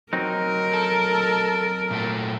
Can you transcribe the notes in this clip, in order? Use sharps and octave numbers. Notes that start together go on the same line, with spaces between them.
F#3 C4 D#4 A#4
A4
A#2 A3 A4